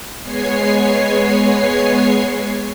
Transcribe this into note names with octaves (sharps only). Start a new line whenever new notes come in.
G#3 B3 C#5 G#5 C7